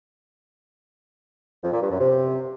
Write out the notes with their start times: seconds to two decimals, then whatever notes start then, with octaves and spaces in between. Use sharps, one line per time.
1.63 F2
1.72 A#2
1.82 G2
1.91 F#2
2.00 C3